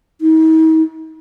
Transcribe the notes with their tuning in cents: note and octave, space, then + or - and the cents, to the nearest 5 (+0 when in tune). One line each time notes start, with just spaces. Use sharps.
D#4 +45